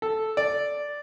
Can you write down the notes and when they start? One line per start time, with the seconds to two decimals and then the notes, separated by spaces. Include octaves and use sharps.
0.02 A4
0.37 D5